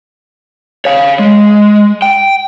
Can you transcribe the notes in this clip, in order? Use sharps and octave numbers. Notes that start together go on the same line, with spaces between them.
C#5 F5
G#3
G5